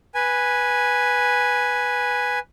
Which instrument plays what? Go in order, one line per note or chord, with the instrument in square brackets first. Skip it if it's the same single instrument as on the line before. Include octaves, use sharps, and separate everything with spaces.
[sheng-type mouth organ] B4 G#5